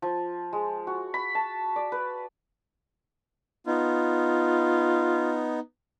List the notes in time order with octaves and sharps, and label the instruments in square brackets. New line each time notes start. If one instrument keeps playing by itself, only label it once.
[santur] F3
G#3
F#4
B5
A5
D5
B4
[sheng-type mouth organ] B3 D#4 [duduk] F4